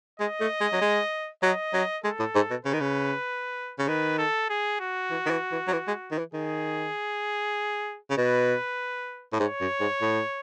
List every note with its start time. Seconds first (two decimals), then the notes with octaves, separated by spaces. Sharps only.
0.20 G#3 D#5
0.41 A3
0.61 G#3
0.73 F#3
0.81 G#3
1.43 F#3 D#5
1.74 F#3
2.04 G#3 A4
2.20 A2
2.35 G#2
2.50 B2
2.65 C#3 B4
2.73 D#3
2.80 C#3
3.79 C#3
3.88 D#3 B4
4.18 A4
4.50 G#4
4.81 F#4
5.11 E3
5.26 D#3
5.31 E3
5.52 E3
5.68 F#3
5.72 E3
5.87 G#3
6.11 D#3
6.18 E3
6.34 D#3 G#4
8.10 C#3
8.17 B2 B4
9.33 A2
9.40 G#2 C#5
9.61 F#2
9.80 G#2
10.02 A2